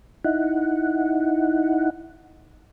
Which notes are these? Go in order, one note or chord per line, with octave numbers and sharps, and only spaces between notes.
D#4 E4 F#5